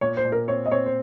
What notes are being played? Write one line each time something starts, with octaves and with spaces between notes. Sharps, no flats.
A#2 C#5
C5
A#2
A#4
C4 C#5
D#5
C4 C#5
C5